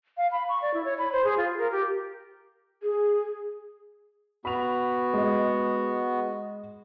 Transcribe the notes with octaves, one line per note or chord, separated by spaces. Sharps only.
F5
B5
C#6
D5
E4
C#5
B5
C5
G#4
F4
A#4
G4
G#4
B3 F#4 B5 F7
G#3 D#5